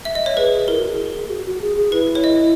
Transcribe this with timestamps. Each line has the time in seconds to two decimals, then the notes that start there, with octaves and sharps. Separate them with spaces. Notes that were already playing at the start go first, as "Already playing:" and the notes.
0.05 E5
0.15 D#5
0.26 C#5
0.37 G#4 B4
0.68 E4 A#4
0.79 F#4
0.89 G#4
1.30 F#4
1.46 F#4
1.61 G#4
1.77 G#4
1.92 E4 B4
2.15 C#5
2.24 D#5